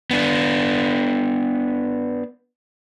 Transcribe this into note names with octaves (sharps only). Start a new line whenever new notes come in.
B3 D4